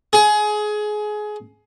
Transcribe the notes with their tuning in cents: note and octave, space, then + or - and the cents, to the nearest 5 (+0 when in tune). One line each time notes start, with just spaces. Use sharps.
G#4 +20